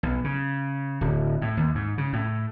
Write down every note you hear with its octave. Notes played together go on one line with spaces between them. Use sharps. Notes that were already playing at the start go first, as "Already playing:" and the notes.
B1
C#3
D1
A2
D#2
G#2
C#3
A2